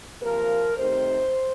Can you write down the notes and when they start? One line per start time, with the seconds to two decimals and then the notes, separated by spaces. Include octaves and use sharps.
0.21 C3 F3 A#3 A#4
0.76 C3 D#3 A3 C4 C5